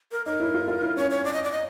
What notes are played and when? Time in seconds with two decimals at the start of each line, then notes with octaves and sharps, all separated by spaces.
0.12 A#4
0.26 D#4 A#4
0.40 E4
0.54 F4
0.68 F4
0.82 E4
0.97 C#4 C#5
1.10 C#5
1.25 D5
1.33 D#5
1.44 D5
1.52 D#5